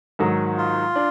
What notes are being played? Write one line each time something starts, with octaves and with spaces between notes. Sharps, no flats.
G#2 D#3 F#3
F4
D4